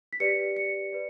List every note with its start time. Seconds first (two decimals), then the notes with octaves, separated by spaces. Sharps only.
0.13 B6
0.20 G4 B4 D5 C#7
0.57 C#7
0.92 B4 D5